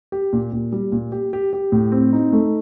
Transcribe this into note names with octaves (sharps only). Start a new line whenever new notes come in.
G4
A#2
A#2
G3
A#2
G4
G4
G4
A2
C4
D#4
A3